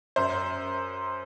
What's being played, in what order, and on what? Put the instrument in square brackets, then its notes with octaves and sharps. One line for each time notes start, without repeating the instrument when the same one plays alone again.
[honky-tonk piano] F#2 C5